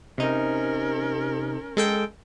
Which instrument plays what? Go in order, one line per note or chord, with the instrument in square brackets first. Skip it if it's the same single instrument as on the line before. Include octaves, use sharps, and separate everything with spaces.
[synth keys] C3 D#4 [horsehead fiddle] C#4 A#4
[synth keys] G#3 A4 G5